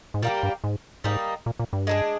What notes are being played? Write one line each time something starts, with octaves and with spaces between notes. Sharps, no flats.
G#2
A#2 G3 A#3 D#4 G4
G2
G#2
G#2 G3 A#3 D#4
A#2
A#2
G2
G#3 D4 G#4